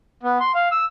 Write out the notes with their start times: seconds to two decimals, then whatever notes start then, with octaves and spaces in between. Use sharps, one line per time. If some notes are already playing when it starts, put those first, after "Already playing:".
0.23 B3
0.40 C6
0.55 F5
0.72 E6